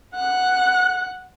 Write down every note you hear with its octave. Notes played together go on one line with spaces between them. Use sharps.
F#5 F#6